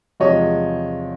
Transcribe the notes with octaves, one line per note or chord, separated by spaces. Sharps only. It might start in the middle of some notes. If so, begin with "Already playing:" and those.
E2 C3 F3 G#3 C#5 D#5